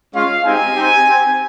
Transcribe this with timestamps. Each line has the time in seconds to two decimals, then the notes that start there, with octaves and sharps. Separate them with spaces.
0.13 G#3 C#4 F4 F5
0.43 G#3 C4 D#4 G4 G#5
0.75 C4 D#4 G4
1.06 C4 G4